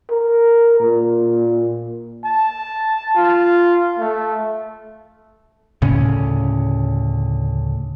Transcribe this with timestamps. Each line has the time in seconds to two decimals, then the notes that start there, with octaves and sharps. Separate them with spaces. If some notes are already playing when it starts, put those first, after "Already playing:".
0.10 A#4
0.80 A#2
2.25 A5
3.16 F4
3.99 A3
5.82 D2 A2 C#3 C#4